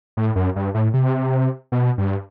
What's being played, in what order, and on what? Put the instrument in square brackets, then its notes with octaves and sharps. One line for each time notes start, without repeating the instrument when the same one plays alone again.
[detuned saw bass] A2
F#2
G2
A2
C3
B2
G2